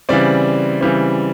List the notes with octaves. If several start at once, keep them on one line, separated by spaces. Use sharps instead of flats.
C#3 E3 G3 C4 D5
C#3 E3 G3 C4